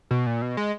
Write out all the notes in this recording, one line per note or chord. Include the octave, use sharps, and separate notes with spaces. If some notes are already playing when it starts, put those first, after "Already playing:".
B2
A#2
B2
G#3